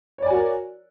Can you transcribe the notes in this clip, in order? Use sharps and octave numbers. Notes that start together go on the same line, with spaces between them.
F#4 A#4 C#5 D5 G#5